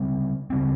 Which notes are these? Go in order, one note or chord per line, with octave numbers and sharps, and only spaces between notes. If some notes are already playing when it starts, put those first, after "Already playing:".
Already playing: C#3 G3 C4
C#3 G3 C4